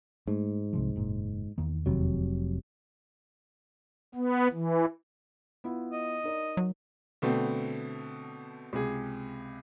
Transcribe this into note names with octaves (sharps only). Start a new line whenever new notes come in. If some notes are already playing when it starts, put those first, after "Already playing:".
G#2 A3
C2 C3 F3
F#1 A#2
E2 D#3 A#3
F1 C3 F#3
B3
E3
B3 E4 F4
D#5
D#4 A#4 D5
F#3
B2 D3 A3 B3 C4
C#2 C3 G#4